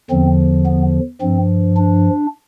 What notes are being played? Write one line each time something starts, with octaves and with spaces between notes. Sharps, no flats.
E2 D3 F3 C4
B3
G2 F3 C4
D4